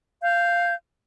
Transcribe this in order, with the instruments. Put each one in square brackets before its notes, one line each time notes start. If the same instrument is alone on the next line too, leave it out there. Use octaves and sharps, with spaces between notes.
[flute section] F5 G6